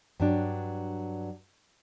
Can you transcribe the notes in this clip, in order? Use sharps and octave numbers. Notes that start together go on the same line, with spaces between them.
G2 F#3 D4